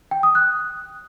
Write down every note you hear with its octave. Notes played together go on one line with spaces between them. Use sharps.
G5
D#6
F#6